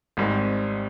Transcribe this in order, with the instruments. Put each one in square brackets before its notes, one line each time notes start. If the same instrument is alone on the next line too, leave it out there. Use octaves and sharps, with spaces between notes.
[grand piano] G#1 G#2 G3 C4